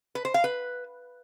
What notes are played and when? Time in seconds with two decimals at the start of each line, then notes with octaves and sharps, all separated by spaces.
0.15 B4
0.25 C5
0.34 F5
0.44 B4